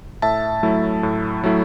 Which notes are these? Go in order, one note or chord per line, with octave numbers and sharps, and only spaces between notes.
A2 E5 A5
F#3 A3 E4
A2
F#3 A3 E4